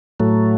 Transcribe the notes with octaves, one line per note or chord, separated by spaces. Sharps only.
A2 F#3 A3